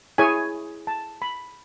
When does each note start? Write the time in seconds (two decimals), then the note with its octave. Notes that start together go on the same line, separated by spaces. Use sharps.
0.18 E4 G#4 C#5 G#5
0.87 A5
1.22 B5